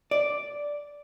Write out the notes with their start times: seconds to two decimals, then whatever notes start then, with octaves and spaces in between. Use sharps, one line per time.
0.11 D5